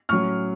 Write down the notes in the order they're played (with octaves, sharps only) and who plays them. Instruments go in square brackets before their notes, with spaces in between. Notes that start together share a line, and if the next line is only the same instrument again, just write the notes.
[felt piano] A2 F#3 C#4 C#6 F6